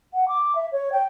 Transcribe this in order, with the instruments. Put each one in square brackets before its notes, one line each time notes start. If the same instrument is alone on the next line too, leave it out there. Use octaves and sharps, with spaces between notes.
[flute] F#5
D6
E5
C#5
G5